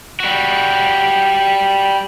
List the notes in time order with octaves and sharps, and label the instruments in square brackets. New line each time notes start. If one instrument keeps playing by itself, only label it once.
[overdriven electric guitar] G3 F#4